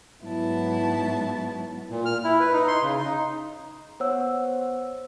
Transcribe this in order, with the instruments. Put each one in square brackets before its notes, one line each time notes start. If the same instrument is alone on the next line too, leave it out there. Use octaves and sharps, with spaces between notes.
[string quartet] G#2 F#3 B3 E4 A5
[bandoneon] A#2
F6
E4
B4
D#4
C6
C#3
D#4
[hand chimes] B3 C5 C#5 F#5 E6